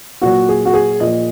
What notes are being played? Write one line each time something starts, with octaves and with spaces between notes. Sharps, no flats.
A#2 F#3 F#4
G#4
F#4
G#4
A#2 F3 D#5